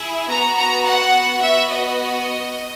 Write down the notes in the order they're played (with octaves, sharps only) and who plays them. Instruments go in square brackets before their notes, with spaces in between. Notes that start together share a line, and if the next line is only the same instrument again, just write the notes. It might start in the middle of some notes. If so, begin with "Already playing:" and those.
Already playing: [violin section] E4 G#4
B3 F#4 A#5
A#5
F#5
B3 F#4 E5
D#5